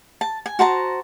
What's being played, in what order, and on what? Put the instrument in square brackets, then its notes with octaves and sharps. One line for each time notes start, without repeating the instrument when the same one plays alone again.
[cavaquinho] A5
G#5
F#4 C5 A5 A#5